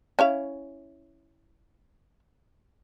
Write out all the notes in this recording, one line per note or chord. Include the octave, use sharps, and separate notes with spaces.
C#4 E4 F5